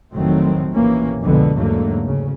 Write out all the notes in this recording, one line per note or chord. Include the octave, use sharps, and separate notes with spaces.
F1 A2 D#3 F#3 A3 C4
A#1 C3 E3 A#3 C#4
C2 F2 B2 D3 G#3 B3
E2 G#2 D3 F#3 A3 A#3
D2 C#3